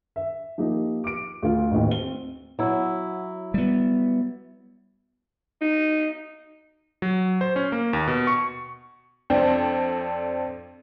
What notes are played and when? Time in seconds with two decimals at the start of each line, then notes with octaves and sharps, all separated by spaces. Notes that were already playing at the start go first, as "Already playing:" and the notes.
0.16 E5
0.58 F3 A#3 D#4 G4
1.04 D6 D7
1.43 D2 F4
1.71 A1 D#2
1.87 C4 G7
2.59 F#3 E4
3.54 G3 B3
5.61 D#4
7.02 F#3
7.41 C5
7.56 C#4
7.72 A#3
7.93 D#2
8.08 B2
8.27 C#6
9.30 F2 C4 D4